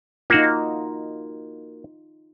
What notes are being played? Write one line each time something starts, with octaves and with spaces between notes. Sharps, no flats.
A#3 D#4 F4 F#4